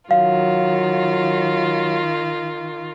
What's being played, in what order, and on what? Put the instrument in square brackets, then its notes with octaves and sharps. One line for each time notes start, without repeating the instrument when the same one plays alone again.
[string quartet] D#3 F4 [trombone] F#3 [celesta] F5